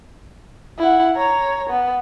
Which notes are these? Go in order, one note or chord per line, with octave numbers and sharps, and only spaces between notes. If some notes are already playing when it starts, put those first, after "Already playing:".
E4 F#5
C#5 A#5
B3